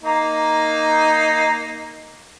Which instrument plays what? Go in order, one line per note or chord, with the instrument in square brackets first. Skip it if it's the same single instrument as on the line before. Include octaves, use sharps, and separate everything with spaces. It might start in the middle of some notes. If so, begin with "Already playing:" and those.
[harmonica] A#3 D#4